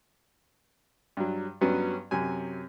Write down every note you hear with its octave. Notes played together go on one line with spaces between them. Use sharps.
G2 F#3
G2 F#3 B3 C#4
F#2 C3 F#3 G#5